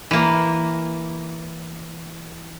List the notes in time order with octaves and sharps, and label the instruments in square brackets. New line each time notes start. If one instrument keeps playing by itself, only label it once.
[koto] E3 A#3